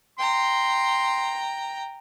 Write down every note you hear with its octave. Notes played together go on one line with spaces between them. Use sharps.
G5 A#5 C6